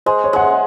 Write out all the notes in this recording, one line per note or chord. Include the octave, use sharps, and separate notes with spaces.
G#3 C5
C#5
G#3 F#5
E5